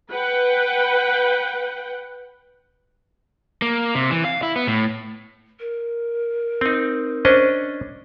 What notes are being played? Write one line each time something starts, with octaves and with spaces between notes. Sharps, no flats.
B4 F#5 G5
A#3
C3
E3
F5
E4
B3
A2
A#4
C4 D#4
C#4 D4 C5 D#5